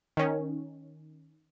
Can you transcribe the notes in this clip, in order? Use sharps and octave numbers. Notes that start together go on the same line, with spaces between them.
D#3 C#4